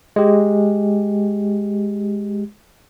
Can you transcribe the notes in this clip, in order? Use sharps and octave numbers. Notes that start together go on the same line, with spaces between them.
G#3 G4